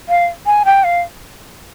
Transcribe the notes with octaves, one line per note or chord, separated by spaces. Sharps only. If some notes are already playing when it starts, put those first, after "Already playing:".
F5
G#5
G5
F5